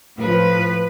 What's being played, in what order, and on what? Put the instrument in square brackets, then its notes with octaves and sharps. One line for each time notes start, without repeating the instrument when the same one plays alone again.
[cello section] A2 F3 B4